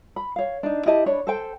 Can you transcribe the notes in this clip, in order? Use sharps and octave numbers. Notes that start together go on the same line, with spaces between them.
B5
C#5 F5
D4 D#4
E4 G4 D#5 A5
D4 C#5 B5
A4 C5 G5